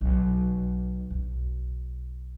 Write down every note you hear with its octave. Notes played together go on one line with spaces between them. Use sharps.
B1
B1